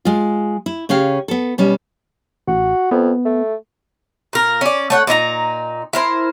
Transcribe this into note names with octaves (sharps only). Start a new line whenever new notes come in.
G#3 F4
E4
C#3 C#4 G4 G#4 F5
B3 A4
B2 G3 C#4
A1 F#4
F2 B3
A3
A#2 A#4
C#4 D5
A3 C#5 F#5
A#2 D#4 E4 A#5
E4 A#4 C5